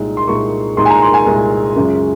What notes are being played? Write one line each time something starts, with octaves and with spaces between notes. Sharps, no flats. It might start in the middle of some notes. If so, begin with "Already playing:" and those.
Already playing: C2 A#2 G#3 D#4
C6
C2 A#2 G#3 D#4 C#6
C2 A#2 G#3 D#4 C6
G#5
A#5
C6
G#5
C2 A#2 G#3 D#4
F#2 C#3 G#3 C#4 F4